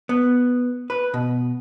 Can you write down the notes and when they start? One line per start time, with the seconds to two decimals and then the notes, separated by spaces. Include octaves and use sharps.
0.09 B3
0.90 B4
1.14 B2